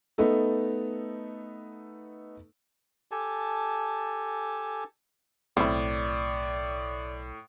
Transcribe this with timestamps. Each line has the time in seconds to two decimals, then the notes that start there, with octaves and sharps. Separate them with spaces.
0.18 A3 B3 D#4 A4
3.11 G4 A4 G#5 A5
5.57 B1 A2 C4 E4 D5